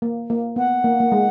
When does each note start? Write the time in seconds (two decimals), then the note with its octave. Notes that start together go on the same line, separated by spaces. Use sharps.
0.02 A#3
0.30 A#3
0.56 B3 F#5
0.84 A#3
1.00 A#3
1.12 G#3